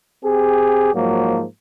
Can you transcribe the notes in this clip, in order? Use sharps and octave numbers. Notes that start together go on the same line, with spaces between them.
C4 G4 G#4
G#2 F3 F#3 A#3